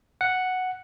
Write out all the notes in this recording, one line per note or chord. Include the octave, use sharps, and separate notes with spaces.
F#5